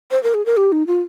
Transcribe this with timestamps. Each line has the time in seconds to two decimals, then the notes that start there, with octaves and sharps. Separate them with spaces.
0.11 C5
0.23 A#4
0.34 G#4
0.46 A#4
0.57 G4
0.72 D#4
0.87 F4